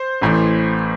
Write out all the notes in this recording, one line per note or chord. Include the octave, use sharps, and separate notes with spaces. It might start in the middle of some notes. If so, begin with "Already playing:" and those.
Already playing: C5
A1 A2 E3